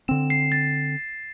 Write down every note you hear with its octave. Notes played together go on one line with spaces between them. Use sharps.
D3 C4 E7
C7
A6